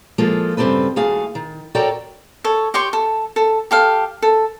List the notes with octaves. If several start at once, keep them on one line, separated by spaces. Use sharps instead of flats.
F3 G#3 A#3 F4 A4
G2 C#3 C4 G4 A4 B4
D#2 A3 F#4 G#4 F5 G#5
D#3
F#4 A4 A#4 C#5 D5 G5
A4 C#5
G4 C#5 C6 C#6
A4
A4
G4 A4 F5
A4